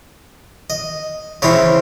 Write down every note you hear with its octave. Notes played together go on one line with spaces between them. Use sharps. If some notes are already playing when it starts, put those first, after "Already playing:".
D#5
C#3 E3 C4 E4 C#5